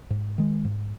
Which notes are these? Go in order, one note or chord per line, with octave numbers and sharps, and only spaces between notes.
G#2
D#3 G#3
G#2